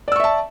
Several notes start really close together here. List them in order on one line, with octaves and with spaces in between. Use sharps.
D5 E6 C#6 E5 A5